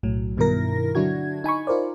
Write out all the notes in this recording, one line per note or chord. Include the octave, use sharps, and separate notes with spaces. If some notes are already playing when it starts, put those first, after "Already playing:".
B1 A2 F#3
G2 B2 D#3 E4 A#4 A#6
D3 F#3 D4 E4 F#4 G#6
D#4 G#5 B5 C#6
D#4 F4 A#4 C5 D5